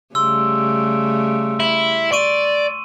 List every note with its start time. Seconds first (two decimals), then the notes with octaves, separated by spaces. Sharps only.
0.15 C#3 G3 A3 C6 E6
1.60 E4 F#7
2.12 D5 C6 C#6 D#7